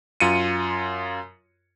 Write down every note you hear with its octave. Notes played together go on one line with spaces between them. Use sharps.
F#2 F4 C#7 D#7